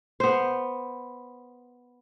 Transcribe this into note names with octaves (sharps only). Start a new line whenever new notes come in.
B3 C5